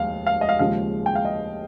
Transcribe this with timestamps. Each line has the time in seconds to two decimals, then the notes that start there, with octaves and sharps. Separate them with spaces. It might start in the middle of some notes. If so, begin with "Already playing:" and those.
Already playing: F1 D#2 G#3 F5
0.27 F5
0.41 D#5
0.49 F5
0.59 D#2 C#3 F3 G#3 F5
1.06 G5
1.15 F5
1.25 D#5